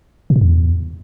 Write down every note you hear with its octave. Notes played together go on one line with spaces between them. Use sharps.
A#2
A2
E2